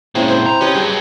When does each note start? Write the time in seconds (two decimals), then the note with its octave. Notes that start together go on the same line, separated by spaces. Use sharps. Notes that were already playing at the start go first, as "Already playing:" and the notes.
0.15 A#2 G#3 C4 C#4 E4
0.29 C5
0.46 A#5
0.61 C#4 G4 B4 D#5
0.74 G2 F#3 G#4